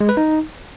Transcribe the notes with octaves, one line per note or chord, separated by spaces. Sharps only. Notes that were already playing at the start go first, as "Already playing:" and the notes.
G#3
B4
D#4